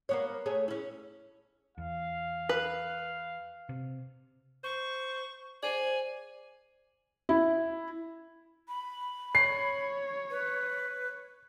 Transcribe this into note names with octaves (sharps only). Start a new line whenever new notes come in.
A#3 B3 C#5
A3 G#4 C#5
C#4 E4
E2 F5
B4
C3
C5 C#6
G#4 C5 D5 G#5
E4
B5
C#5 C7
B4